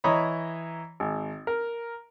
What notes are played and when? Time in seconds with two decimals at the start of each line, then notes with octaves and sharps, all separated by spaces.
0.04 E3 C#5 D#5 A#5 B5
1.00 G#1
1.47 A#4